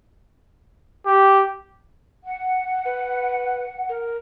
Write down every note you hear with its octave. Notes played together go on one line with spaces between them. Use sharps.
G4
F#5
B4
A#4